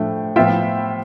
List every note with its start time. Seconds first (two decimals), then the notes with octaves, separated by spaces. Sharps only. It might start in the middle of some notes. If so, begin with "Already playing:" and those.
Already playing: A2 F3 A3 D4 G5
0.36 A2 F3 B3 F4 E5 G5